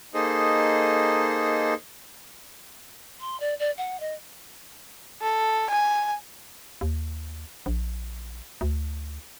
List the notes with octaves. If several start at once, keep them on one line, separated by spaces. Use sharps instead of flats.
A#3 D#4 G#4 A4 C5 D#5
C6
D5
D5
F#5
D#5
A4
G#5
D#2
A#1
D2